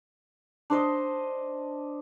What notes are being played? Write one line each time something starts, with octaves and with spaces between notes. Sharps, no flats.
D4 C5 D#5